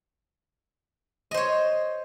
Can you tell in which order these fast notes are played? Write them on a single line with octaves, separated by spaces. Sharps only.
D#5 C5 C#5